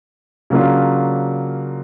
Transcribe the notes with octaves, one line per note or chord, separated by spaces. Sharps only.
C#3 F#3 A#3 D4 F4